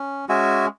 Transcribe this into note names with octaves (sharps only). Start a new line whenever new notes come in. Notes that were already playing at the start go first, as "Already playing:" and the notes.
Already playing: C#4
G#3 C#4 F#4 E5 G#5